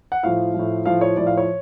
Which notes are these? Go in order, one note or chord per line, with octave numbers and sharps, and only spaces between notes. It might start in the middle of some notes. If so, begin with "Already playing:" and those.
F#5
A2 F3 F5
A2 F3
A2 F3 F5
C#5
A2 F3 D5
F5
C#5